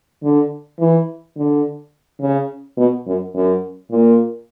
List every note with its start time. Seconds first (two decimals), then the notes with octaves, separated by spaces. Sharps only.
0.23 D3
0.79 E3
1.36 D3
2.21 C#3
2.77 B2
3.07 F#2
3.35 F#2
3.91 A#2